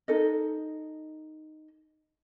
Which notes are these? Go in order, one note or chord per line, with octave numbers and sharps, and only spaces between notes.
D#4 A4 D#5